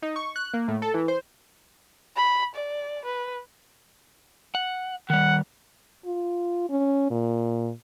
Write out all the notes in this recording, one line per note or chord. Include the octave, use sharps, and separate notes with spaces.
D#4
C#6
F#6
A#3
A2
A4
E3
C5
B5
D5
B4
F#5
D#3 G3 F#5
F4
C#4
A#2